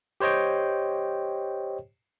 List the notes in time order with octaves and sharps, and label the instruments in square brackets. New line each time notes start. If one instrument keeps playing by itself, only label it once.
[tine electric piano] G4 C5 C#5 D#5 G5